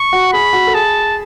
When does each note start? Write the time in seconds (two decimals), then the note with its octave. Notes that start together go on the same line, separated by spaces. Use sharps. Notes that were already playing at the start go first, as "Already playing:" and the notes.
Already playing: C#6
0.13 F#4
0.33 G#4 B5
0.53 F#4
0.67 A4
0.74 G#4 A5